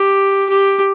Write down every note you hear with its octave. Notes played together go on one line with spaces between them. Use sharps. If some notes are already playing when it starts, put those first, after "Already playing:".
Already playing: G4
G4